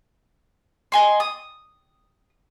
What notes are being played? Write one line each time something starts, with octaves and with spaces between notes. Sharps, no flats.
D#5 G#5 C6
D#6